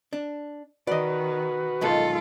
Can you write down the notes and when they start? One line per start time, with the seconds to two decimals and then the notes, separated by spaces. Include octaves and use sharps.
0.13 D4
0.87 D#3 F#4 B4 D5 D#5
1.81 B1 D#3 G#3 F4 A4